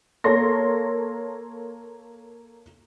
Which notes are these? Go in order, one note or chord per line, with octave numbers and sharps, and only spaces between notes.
A#3 A4 A#4 C#5 C6 A#6